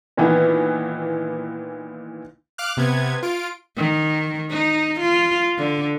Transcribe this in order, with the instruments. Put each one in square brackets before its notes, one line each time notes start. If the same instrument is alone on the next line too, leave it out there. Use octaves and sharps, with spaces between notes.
[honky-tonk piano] A#2 D#3 E3 B3
[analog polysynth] F5 D6 F6 F#6
C3 B3 G#6
F4 D7
[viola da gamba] D#3
D#4
F4
D3